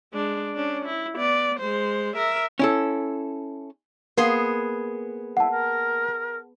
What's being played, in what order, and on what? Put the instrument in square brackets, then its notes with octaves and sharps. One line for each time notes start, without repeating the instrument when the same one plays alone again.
[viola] G#3 D4
C#4 D4
E4
B3 D5
G#3 C5
A#4 E5
[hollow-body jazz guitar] C#4 E4 A4
[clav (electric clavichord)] A#3 [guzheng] B3 G#4 C6
[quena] E4 [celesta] F#5 A5
[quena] A#4